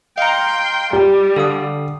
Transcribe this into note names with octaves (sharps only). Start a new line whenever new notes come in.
D#5 F5 G5 A#5 C6 C#7
G3 G4
D3 A4 F5 D#6